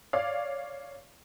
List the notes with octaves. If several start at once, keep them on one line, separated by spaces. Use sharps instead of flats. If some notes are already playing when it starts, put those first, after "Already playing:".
C#5 D5 F5